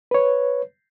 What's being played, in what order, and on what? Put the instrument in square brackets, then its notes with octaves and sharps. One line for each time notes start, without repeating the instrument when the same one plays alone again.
[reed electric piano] B4 C#5